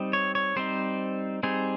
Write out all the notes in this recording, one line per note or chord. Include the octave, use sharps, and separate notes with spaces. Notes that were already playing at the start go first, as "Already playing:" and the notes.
Already playing: G3 C4 D#4
C#5
C#5
G3 C4 D#4 C5
G3 C4 D#4 G#4